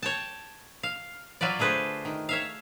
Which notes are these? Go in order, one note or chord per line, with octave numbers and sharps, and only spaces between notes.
C#5 G5 A5
F5
F#3 F4 B4 D5
D3 A3 G#4 B4 C5
D#3
C#5 E5 F5